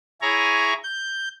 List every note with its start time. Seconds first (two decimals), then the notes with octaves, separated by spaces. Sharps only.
0.22 E4 G#4 C#5 G#5 A#5
0.84 G6